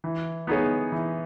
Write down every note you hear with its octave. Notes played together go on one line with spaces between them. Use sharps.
E3
B3 D#4 G#4 C#5
E3